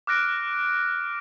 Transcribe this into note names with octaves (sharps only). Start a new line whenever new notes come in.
D6 F6 F#6 A#6 D7